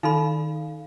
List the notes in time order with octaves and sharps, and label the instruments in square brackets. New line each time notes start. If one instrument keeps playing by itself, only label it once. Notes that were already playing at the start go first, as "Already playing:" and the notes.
[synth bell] D#3 F5 [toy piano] D#4 A4 B5